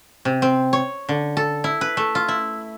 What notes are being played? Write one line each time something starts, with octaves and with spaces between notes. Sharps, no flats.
C3
C4
C#5
D3
A4
E4
B4
A3
F4
E4